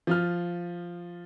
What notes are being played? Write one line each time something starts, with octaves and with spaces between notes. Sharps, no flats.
F3 F4 F6